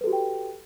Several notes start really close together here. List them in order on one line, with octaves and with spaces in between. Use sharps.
B4 A4 F#4 G4 G5